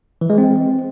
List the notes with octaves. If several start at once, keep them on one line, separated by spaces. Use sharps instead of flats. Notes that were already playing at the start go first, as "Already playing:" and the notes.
E3
G#3
C4